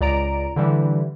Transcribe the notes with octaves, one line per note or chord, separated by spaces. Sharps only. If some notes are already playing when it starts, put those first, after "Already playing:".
C#2 D5 A#5 D7
D3 E3 G3